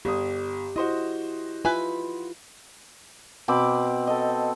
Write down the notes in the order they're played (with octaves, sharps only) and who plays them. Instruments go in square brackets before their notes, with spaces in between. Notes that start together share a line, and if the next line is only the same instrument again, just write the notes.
[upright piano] G1 D#6 [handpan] G4
[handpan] E4 [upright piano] F#4 C5 D#5
[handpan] F4 [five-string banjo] B4 E5 G#5
[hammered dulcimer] B2 C4 B5 D6
A4 D#5